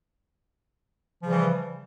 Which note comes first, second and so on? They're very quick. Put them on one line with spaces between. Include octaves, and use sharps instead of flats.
F3 C#3 G3 E3